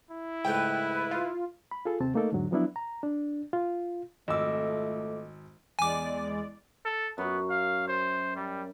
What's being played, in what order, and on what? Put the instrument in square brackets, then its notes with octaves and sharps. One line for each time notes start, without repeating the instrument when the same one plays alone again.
[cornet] E4
[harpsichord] C#2 G#2 A3 [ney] B4 [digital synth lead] G5
[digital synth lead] F4
[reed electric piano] B5
F4 G#4 A4
D#2 C3 C4 A5
A3 A#3 D#4 A4 A#4
E2 G#2 D3 F#3
F3 F#3 B3 D4 E4
A#5
D4
F4
[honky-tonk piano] G#1 E6 [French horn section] F2 A3 [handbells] D#5 D6
[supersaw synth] E2 G#3 D5 [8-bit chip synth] G#5 D6
[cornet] A4
[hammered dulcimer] F#2 [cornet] B3
[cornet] F5
C5
G3